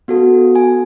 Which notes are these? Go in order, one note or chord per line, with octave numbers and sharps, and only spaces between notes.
B3 F#4 A4
G#5